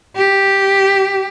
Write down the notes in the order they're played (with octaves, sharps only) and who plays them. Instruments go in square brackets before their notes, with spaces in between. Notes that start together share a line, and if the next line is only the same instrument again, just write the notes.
[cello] G4